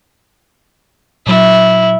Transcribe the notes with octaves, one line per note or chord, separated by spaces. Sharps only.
A#2 F#3 E4